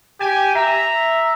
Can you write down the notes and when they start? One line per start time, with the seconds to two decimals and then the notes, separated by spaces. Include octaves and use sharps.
0.20 G4 G#5
0.55 E5 A#5